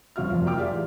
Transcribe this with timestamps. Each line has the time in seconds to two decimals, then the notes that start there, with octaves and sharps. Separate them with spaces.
0.16 D#1 F#2 F4 F#4 F6
0.30 F1 F2 F4
0.44 F#2 F#3 A#3 G5 D6 F6
0.57 F4 G4 G#4 D5 E5 F5
0.71 A1